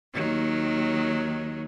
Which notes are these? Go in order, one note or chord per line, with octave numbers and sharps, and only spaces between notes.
D#2 D#3 F#3